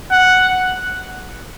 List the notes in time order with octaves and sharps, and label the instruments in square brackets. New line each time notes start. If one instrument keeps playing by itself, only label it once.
[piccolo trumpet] F#5